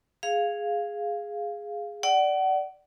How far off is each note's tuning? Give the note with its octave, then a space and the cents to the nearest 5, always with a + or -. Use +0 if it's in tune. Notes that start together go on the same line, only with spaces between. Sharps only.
G#4 +0 F5 +0
D5 +0 F#5 +30